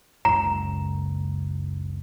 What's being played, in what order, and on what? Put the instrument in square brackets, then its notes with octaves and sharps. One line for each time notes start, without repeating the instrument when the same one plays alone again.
[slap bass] F#1 C#2 F#2 [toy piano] A#5